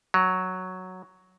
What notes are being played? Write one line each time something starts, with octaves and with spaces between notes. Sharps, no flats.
F#3